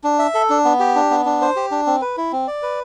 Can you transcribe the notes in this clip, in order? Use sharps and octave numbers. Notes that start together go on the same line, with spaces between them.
D4
E5
A4
D4
B3
G4
D4
B3
D4
C5
G4
D4
C4
B4
E4
C4
D5
B4